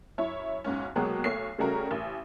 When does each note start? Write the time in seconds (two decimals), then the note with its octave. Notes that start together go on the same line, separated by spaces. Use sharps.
0.18 F#2 E4 C#5
0.64 B1 G#2 C#4
0.96 B2 F#3 G#3 A#3 G4
1.24 B1 A3 C#5 C7
1.58 C#3 G3 A3 C#4 F#4 A#4
1.91 A1